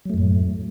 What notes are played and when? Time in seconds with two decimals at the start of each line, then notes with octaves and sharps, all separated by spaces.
0.05 F#3
0.10 A3
0.14 F#2
0.18 A2